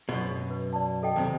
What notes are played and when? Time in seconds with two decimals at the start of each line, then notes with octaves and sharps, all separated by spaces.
0.09 F#2 B2 F#4
0.51 B4
0.73 D5 A5
1.03 A4 D#5 G5
1.16 D#2 C3